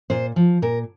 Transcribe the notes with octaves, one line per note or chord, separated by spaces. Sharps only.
A#2 C5
F3
A#2 A#4